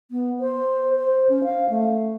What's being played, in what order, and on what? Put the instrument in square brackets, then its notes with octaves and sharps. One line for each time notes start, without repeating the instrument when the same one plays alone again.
[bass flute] B3
C5
C5
C#4
F5
A3